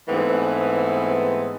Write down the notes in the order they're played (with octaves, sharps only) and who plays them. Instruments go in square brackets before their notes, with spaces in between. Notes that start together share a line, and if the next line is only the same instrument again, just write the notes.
[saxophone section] G#2 E3 A3 B3 C4